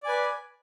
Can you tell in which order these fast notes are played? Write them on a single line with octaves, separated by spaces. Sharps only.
D5 G#5 B4